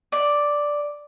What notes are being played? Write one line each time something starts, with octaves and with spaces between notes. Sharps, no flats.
D5